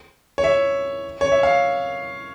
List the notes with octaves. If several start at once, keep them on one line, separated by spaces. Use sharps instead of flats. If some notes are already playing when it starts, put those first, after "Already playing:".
C#5
E5
C#5
E5
F5